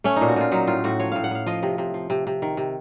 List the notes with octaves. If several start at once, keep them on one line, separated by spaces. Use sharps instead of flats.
A3 C#4
A#2 D#4
F#4
A#2 F4
F#3 D#4
A2 F4
A2 F#4
F3 C#5
A2 F5
F#5
A2 F5
F3 D#5
C3
C3
F3
C3
C3
D#3
C3